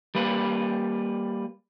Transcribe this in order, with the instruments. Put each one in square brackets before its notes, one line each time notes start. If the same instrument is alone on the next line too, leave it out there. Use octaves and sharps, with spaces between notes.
[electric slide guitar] G3 A#3 B4